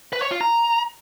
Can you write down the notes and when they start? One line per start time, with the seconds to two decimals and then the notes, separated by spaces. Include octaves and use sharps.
0.13 B4
0.22 C#5
0.31 F4
0.41 A#5